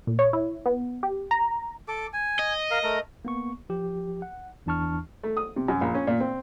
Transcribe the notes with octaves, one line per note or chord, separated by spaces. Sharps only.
A#2
C#5
E4
B3
G4
A#5
A4 D6
G#5
D#5
A#4 F5
A3 A#4
A#3 B3 C#6
F3 G4
F#5
E2 E3 D4 A5 C#6 F6
A3
D#6
C3
F#2
A#1
C#4
A#2
C4